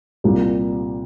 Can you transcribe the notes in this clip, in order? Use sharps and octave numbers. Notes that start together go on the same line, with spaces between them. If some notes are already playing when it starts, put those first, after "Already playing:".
C2 A#2 G3 A#3